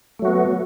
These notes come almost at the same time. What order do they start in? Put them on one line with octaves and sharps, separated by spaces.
A3 F#3 F#4 B3